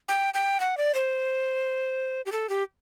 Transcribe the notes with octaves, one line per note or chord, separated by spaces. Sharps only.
G5
G5
F#5
D5
C5
G4
A4
G4